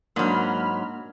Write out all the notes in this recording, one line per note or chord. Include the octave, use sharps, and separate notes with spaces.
G#2 F#3 A#3 D4 B5 F6